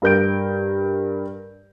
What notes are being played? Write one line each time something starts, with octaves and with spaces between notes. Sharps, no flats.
G2 A#4 G6 D7